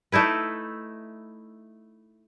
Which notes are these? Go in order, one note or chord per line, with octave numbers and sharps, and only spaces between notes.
A3 D#4 E4 B4